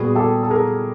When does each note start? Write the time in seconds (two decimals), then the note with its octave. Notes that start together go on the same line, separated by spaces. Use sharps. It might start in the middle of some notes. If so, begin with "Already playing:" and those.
Already playing: A#2 G3 B3 F#4 G#4
0.15 G4 A4
0.43 A4
0.50 G#4 A#4